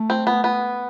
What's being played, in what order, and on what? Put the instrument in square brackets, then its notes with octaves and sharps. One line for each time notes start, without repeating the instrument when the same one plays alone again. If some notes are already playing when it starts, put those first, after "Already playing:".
Already playing: [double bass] A3
[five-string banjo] C4
B3
B3